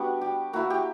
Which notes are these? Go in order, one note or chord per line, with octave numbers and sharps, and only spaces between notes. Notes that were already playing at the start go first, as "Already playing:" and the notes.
Already playing: G3 B3 D4 F#4
G4
A#3 E4 F#4
G4